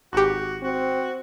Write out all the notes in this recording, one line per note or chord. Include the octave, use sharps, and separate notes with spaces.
G#1 F#4 G4
C4 F#4